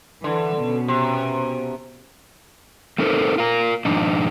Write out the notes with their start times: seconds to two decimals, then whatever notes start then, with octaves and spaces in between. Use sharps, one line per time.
0.24 D3 E3
0.58 B2 B3 C#4
0.88 C3
2.98 A3 C4 D#4 A4 A#4 C5
3.38 F4 A#4
3.85 G#2 F3 D4 D#4